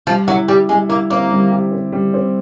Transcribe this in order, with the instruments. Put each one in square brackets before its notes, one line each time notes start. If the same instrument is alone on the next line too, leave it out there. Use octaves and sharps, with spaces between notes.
[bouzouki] F3 [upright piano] G3
[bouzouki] F#3 [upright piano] E4
[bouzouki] G3 [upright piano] G4
[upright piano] G3 [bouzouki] G#3
[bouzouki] A#3 [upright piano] E4
[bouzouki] A#3 [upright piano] C4
[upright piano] G3
G4
C4
G3
C4